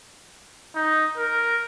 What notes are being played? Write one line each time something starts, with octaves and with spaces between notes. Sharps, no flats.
D#4
A#4